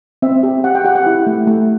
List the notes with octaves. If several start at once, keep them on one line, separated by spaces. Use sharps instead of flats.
C4 E5
G4
G4 F#5
G5
G4 F#5
F#5
E4
A3
A3